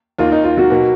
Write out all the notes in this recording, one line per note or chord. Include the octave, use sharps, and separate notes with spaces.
D#2 D#3 A#3 F4
D#4
F4
F#3 F#4
B2 A#3